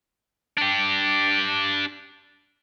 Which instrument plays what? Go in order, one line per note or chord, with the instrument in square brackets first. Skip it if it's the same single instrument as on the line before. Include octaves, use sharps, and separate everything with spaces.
[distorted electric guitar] D4 G4